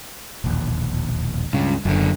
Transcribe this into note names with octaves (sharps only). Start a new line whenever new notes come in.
E1 A#1 D#2
C#2 G2 C#3
F#1 F#2 D3